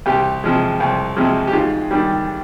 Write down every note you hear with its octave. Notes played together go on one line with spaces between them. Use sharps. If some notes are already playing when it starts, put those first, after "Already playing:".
C2 G4
C3 F3 G#3
C2
C3 F3 G#3
G4
G#2 F4
D#3 G3